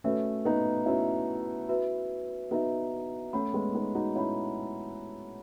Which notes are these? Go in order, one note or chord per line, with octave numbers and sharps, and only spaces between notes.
A3 C#4 F#4 B4 E5
B3 D#4
C#4 E4 F#4 B4 E5
F#4 B4 E5
B3 D#4 F#4 B4 E5
A3 C#4 C#5 F#5 B5
G#3 B3
B3 D#4
D#4 F#4
C#4 E4 C#5 F#5 B5